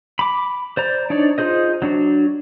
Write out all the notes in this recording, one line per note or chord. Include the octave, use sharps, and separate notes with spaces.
B5 D6
C5 D5 A#5
D4 D#4 C#5 D5
D#4 F4 G#4 C5 D#5
F#3 D4 F#4